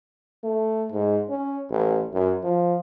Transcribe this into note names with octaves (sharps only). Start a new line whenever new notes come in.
A3
G#2
C#4
A1
F#2
F3